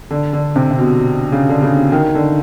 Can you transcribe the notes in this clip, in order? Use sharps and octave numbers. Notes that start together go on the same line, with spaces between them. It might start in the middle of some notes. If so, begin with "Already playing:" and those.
D3
D3
C3
C3
B2
C#3
D3
C#3
D#3
D3